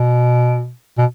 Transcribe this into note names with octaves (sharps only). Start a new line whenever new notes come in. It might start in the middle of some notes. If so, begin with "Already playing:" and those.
Already playing: B2
B2